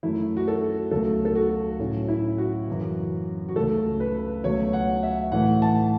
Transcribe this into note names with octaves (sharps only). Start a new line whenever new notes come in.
F#2 F#3 A3 E4
F#4
A4
C#2 B2 F#3 A3 A4
A4
F#4
A2 F#3 A3 C#4
E4
F#4
F#2 C#3 E3
F#4
C#2 C#3 A3 A4
B4
C#2 B2 F#3 A3 C#5
F#5
E5
A2 E3 A3 F#5
A5